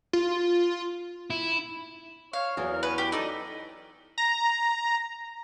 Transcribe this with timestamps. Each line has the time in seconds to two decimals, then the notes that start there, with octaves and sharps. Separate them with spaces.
0.13 F4
1.30 E4
2.33 C#5 F5
2.57 E2 E3 F#3 G#4
2.72 A#4
2.83 C#4 B4
2.98 G4
3.12 D#4 A4 D5
4.18 A#5